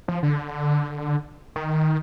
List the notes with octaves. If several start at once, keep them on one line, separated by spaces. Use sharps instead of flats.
F3
D3
D#3